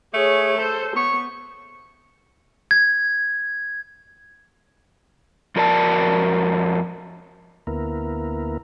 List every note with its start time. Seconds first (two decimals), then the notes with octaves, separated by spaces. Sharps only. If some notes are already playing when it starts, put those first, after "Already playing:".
0.14 A3 G#4 C#5
0.57 A4 C5
0.96 B3 C#5 C#6
2.71 G#6
5.56 F2 F#4 A#4 D5 A5
7.67 D2 A#3 B3 E4 A#4